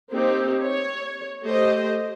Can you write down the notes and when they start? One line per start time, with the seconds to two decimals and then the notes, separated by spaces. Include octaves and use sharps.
0.12 A#3 C4 D#4 G4
0.62 C#5
1.44 A3 G4 C5 D#5